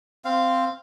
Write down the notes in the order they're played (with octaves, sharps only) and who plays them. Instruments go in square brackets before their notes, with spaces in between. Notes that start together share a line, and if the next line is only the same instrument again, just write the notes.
[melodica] C4 F5